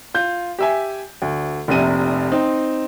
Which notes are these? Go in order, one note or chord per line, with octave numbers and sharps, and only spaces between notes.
F4 G6
G4 E5 G#5
D2
F1 A#1 C3 D#7
C4 D#4